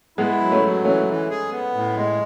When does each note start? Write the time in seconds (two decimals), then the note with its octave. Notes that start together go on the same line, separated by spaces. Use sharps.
0.18 G#3 B3 E4
0.40 F#3
0.51 A3 C#4
0.63 F#3
0.84 E3 A3 C#4
1.07 E3
1.30 G#4
1.51 B3
1.74 A2
1.96 G#3